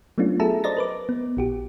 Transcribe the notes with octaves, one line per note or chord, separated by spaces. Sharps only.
F#3 A3 B3 C#4 D4 F4
F#4 G#4 A4 E5 A5 A#5
C5 D5 D#5 A#5 A6 A#6
A#4 B4 D6
B3
A#1 F#4 G4